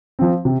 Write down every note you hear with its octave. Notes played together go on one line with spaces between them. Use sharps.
F3 C4
C3